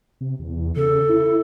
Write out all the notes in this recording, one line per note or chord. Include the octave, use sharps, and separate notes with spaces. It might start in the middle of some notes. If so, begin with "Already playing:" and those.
C3
E2
C#3 A4
E4